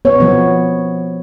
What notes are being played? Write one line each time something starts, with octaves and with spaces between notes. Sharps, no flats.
B3 C#5
F3 B3